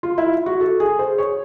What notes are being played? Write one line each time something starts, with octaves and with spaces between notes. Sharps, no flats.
F4
E4
F#4
A4
G#4
C5
C#5